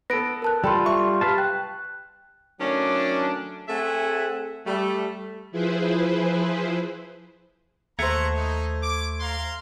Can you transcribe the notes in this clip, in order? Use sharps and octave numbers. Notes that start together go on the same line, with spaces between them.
B3 A4 A#6 D7
A#4 A5 F#6
G3 F4 A4 G5 B5 C6
E5 C6 C#6
G4 B4 F5 A5
G5 F#6
D#3 F#3 A3 C#4 D4
A3 C4 G#4 E5 F#5 G#5
G3 A3
F3 E4 G#4 B4 C5
D#2 A3 C5 F#5 A#5 G#6
D#4
D6
F5 A#5 C6